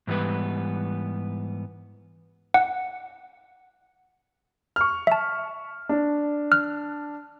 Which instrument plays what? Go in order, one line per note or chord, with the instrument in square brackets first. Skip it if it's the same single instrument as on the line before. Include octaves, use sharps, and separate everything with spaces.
[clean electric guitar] G#2 E3 G3 B3 B4
[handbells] F#5
[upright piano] C#6 F6
[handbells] E5 A5
[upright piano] D4
[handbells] F6 F#6